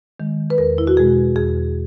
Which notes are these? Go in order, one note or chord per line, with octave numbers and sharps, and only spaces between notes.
D#3 G#3
B4
E2 A#4
E4
F#4
B2 G#3 G#4
E2 G#4